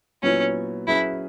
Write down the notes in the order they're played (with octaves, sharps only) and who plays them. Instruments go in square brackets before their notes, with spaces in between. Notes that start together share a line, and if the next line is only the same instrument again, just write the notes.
[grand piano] A#2 F#3 B3 E4 [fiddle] C#4
[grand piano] F#3 C#4 G#4 B4 [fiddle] E4